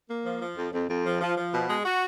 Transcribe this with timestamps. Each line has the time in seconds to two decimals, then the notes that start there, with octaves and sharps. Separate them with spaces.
0.08 A#3
0.24 F3
0.41 F3
0.56 F2
0.72 F2
0.89 F2
1.05 F3
1.20 F3
1.36 F3
1.53 B2
1.68 G#3
1.85 F#4